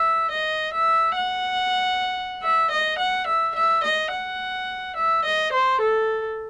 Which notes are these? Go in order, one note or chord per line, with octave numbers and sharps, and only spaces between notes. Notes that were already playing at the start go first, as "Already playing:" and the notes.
Already playing: E5
D#5
E5
F#5
E5
D#5
F#5
E5
E5
D#5
F#5
E5
D#5
C5
A4